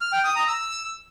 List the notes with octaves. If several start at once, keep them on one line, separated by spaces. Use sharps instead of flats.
F6
G5
D#6
A#5
E6